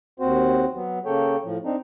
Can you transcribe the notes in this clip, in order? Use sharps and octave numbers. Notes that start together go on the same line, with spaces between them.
D#2 C4 F#4 C5
F#3 B3
C#3 A#3 A4 C#5 G5
A2 F3
C4 D4 D#4